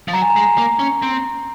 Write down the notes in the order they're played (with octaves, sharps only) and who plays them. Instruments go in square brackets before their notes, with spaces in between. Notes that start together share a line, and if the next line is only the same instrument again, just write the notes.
[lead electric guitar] F3
[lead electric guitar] F#3 [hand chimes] A#5
[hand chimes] G#5
A#5
[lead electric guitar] G#3
A#3
C#4
C4